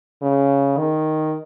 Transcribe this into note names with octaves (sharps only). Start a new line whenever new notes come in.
C#3
D#3